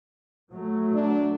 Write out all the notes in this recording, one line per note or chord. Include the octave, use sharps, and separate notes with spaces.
F#3 A3
D4